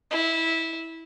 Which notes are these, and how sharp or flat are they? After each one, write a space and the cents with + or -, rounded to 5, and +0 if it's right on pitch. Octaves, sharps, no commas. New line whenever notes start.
E4 -15